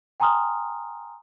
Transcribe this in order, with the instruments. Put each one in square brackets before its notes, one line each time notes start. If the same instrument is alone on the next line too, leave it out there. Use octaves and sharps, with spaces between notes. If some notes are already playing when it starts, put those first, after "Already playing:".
[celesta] G5 G#5 A#5 C6 D#6 F6